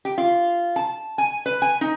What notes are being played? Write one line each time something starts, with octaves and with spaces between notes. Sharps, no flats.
G4
F4
A5
G#5
B4
G#5
D#4